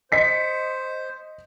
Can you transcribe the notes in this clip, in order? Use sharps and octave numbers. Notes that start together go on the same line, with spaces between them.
C5 D#5 B6 C#7